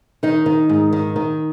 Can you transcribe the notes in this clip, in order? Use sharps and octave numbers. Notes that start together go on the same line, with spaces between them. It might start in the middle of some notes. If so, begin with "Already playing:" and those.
D#3 D#4
D#3
G#2
D#3
D#3